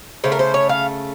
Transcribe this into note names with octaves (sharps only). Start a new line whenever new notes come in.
C#3 A3 C5
A#4
C5
C#5
F5